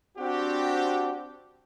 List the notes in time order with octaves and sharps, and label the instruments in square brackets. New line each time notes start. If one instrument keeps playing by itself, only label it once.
[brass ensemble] C4 D4 F#4 G4